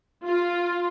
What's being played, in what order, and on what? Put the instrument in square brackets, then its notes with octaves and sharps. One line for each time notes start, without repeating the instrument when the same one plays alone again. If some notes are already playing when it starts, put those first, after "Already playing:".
[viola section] F4